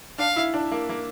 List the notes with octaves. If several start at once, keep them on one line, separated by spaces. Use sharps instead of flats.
D4 F5
E4
D4
A#3
A#3